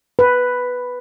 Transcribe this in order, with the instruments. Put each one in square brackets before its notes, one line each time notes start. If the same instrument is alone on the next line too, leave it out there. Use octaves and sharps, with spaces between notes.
[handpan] B4